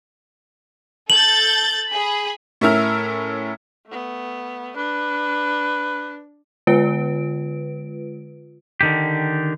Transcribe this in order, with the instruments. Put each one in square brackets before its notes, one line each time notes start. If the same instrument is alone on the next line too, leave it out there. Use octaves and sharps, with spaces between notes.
[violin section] A4 G6 A6 [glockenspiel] F#7
[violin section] G#4 B5
[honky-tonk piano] A2 C#4 E4 A#4 E6 F6
[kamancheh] A3 B3
[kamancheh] D4 [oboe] B4
[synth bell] D3 G#3 F4 B4 D7
[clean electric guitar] D3 D#3 G4